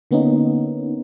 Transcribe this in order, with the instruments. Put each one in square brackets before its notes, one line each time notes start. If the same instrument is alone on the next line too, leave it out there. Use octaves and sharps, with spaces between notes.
[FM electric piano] D3 A#3 B3 C#4 D#4